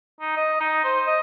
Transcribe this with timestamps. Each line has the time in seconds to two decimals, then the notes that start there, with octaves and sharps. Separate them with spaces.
0.21 D#4
0.36 D#5
0.60 D#4
0.84 C5
1.07 D#5